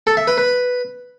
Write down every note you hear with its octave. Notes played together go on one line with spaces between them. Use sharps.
A4
E5
B4
B4